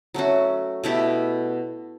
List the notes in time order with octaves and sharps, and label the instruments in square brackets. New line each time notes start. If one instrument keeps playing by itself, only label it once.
[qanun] F#3 A3 C#4 F#4
B2 A3 E4 G4